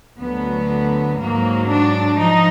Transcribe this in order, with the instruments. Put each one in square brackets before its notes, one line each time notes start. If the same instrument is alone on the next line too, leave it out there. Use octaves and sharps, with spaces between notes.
[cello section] D2 D3 F#3 B3
G#2 F#3 A#3
D4
F3 D#4